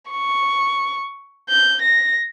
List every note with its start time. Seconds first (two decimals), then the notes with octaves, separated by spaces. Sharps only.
0.11 C#6
1.50 G6
1.82 A#6